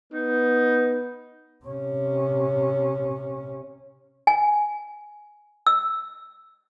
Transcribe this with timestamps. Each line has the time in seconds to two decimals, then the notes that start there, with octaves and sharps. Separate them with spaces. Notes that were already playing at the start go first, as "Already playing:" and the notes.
0.12 B3 D#4
1.65 C3 C#4
4.27 G#5
5.67 E6